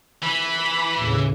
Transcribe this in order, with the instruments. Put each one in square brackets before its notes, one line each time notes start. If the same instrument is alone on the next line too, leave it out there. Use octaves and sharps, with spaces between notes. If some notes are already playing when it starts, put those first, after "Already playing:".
[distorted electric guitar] E3 [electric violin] B5
[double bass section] D#2 A2 C#3